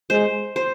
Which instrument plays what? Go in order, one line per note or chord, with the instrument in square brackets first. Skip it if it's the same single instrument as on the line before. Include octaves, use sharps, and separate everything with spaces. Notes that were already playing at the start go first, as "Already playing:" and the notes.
[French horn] G#3 [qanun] C5
[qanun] C5